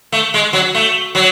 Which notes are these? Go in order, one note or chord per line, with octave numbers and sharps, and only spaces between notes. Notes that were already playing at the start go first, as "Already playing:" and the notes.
A3
G#3
F#3
A3
F#3